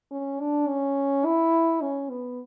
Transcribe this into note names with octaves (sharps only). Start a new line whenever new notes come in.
C#4
D4
C#4
E4
C#4
B3